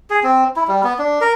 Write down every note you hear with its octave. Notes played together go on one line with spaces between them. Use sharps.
G#4
C4
E4
G3
B3
D4
A#4